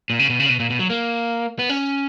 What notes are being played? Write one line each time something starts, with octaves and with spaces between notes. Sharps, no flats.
A#2
C#3
B2
C#3
B2
A#2
B2
F#3
A#3
B3
C#4